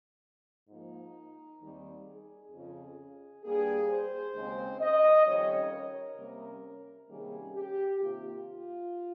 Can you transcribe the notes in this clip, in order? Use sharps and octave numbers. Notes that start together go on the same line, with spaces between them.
G#2 F3 A#3 D#4
D#2 D#3 G3 C4
G#4
F2 C#3 F3
G2 G3 A#3 G#4
C5
D#2 C#3 G#3 C4
D#5
F2 D#3 G3 C#4 C#5
A#4
C3 G3 A#3 C#4
C3 D#3 G3 A#3 C#4 G#4
G4
C3 D#3 A#3 F4
F4